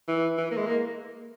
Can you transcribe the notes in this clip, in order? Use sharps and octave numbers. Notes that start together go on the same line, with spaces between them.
E3
E3
A#3
G#3
A#3